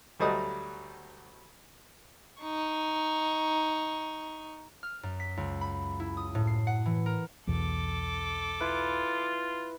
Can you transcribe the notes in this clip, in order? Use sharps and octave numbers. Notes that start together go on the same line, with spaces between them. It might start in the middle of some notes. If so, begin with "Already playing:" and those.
D2 F#3 G3 A3 D#5 D#6
D#4 C#6
F6
F#2
B6
C#2
B5
E4
D#6
A2
C7
F#5
E3
A#4
B1 E2 B2 A4 D6
E4 F4 B4